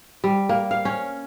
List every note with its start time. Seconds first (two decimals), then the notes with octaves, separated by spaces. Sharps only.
0.24 G3
0.49 A#3
0.71 F5
0.85 C#4